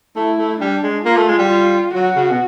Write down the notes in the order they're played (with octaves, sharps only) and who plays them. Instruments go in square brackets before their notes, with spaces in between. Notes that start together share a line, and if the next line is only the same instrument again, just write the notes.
[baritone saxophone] A3 [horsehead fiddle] E4
[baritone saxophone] A3
[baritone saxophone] G3 [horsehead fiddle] D4
[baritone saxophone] G#3
[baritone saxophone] A#3 [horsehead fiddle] F4
[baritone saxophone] A3
G#3
G3
[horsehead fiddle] F4
[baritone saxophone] F#3 [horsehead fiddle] F#4
[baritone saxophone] C#3
B2